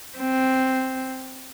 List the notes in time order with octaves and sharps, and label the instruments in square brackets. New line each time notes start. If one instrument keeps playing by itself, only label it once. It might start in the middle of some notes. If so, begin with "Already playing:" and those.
[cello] C4